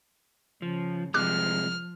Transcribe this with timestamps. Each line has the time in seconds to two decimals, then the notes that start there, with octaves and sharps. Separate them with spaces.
0.62 C#3 F3
1.14 C3 F3 G3 G#3 D6 F6 F#6